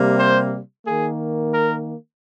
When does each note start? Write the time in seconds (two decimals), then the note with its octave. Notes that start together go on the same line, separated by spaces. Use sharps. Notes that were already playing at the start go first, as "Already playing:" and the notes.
Already playing: C3 G3 A#3
0.19 C5
0.86 D#3 A#3 G#4
1.54 A#4